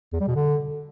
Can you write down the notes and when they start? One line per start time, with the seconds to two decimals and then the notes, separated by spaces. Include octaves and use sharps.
0.13 E2
0.20 G3
0.28 B2
0.35 D3